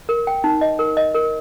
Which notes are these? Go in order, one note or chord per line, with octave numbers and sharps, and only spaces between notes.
A#4
G5
D#4
D#5
A#4
D#5
A#4